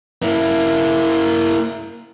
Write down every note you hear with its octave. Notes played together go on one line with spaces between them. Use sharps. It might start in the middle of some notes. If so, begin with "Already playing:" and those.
A#3 E4